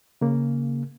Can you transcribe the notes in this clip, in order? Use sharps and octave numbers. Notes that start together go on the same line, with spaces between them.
C#3 A#3